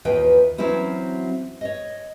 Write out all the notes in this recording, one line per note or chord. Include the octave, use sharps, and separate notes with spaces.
D#2 E3 F4 B4 G5
E3 F#3 C4 C#4 E4 F#4
C#5 D#5